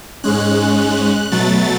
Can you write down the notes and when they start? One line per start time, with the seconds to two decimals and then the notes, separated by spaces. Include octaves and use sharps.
0.23 G#2 G#3 C#4 F#6
1.31 B2 F#3 A3 A6